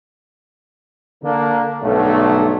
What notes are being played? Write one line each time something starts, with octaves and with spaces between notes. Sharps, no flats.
D3 A#3 D4
B1 G2 D3 F#3 A3